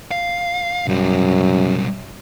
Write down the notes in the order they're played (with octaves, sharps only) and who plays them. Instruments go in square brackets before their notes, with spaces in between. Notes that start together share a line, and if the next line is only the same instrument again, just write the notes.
[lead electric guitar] F5
[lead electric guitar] B1 G3 [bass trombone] F#2